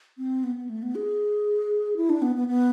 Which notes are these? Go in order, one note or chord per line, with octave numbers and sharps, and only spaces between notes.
C4
B3
B3
A3
B3
G#4
E4
D4
B3
B3
B3